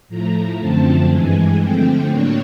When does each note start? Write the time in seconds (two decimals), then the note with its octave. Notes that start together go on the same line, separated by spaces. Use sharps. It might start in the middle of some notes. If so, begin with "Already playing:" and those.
0.09 A2 F3 A3 A#5
0.59 F#2 D3 F3 A3 C4 A5
1.10 G2 E3 G#3 G#5
1.60 D3 F3 A3 C4 G5
2.09 A2 F#3 A#3 D4 C#5